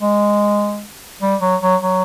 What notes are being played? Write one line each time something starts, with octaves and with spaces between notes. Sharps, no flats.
G#3
G3
F#3
F#3
F#3